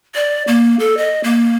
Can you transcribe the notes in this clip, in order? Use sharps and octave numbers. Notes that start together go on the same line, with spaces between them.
D5
A#3
A4
D#5
A#3